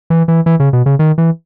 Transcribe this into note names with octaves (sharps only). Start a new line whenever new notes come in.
E3
E3
E3
C#3
B2
C#3
D#3
E3